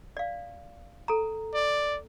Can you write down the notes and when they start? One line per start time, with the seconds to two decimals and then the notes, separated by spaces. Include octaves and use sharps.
0.17 D5 F5
1.08 A4 A#5
1.54 D5